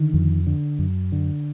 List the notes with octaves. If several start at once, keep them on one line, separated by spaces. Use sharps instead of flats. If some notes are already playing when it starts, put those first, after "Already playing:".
Already playing: D3 D#3
F2
D3
F#2
D3